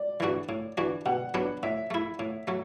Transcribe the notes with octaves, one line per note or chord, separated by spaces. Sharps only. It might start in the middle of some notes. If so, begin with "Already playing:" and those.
Already playing: D5
E3 A3 D4 F#4
A2
E3 D4 F#4
B2 F#5
F#3 B3 D4
A2 E5
A3 E4
A2
F#3 A3